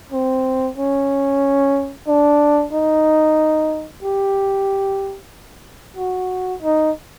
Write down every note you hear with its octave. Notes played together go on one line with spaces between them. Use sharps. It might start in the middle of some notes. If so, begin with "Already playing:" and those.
C4
C#4
D4
D#4
G4
F#4
D#4